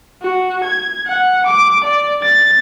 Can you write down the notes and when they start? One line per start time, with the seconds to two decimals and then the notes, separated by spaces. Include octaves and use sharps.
0.22 F#4
0.64 G#6
1.07 F#5
1.47 D6
1.84 D5
2.22 A6